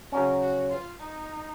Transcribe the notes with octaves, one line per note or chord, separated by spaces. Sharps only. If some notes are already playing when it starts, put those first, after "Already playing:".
C#3 F#3 C#4 A#4
F#4
F4
D#4